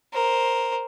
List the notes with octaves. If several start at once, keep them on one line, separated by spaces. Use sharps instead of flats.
A#4 C5